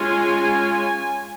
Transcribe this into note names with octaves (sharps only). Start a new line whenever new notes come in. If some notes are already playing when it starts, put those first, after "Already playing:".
Already playing: G#3 C#4 F4 G#5